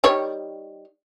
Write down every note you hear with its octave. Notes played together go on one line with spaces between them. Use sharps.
D#3 G3 C#5